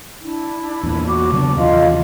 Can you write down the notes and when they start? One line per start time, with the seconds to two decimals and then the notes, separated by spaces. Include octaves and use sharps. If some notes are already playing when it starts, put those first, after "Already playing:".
0.21 D4 E4
0.83 E2 A#2
1.06 F#4 D6
1.32 C#3 F#3 B3 D4
1.56 D#2 C3 E3 F4 D#5 F5